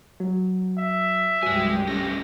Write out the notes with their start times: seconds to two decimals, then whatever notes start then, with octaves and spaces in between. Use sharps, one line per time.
0.20 F#3
0.78 E5
1.43 C2 G2 F#3 G#3 G4 G#5
1.87 A3 C#4 F4 A#6